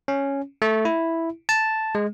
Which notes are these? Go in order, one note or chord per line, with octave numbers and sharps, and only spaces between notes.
C#4
A3
E4
A5
G#3